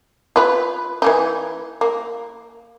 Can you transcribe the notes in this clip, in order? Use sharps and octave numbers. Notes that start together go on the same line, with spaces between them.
F4 B4
E3 A#3 D#4
A#3